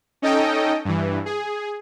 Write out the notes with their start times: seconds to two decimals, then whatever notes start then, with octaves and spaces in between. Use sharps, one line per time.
0.22 C#4 D#4 A4 D#5 G5
0.85 G2 E3
1.26 G#4